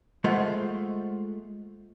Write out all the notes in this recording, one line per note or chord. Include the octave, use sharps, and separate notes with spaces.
G#3 A3 F4 C5 F#5